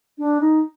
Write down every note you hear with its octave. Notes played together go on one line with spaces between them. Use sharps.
D4
D#4